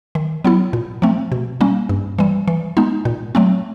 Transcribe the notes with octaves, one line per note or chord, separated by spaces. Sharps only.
D#3
F#3 B3 E4
A#2
F3 A3 C4
B2
G3 A#3 C#4
G2
E3 G3
E3
G#3 B3 D#4
A#2
F#3 A3 C4